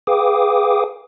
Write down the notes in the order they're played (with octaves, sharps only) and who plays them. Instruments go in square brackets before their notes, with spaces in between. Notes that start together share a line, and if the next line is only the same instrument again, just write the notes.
[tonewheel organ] G#4 B4 F5 G5 D6 D#6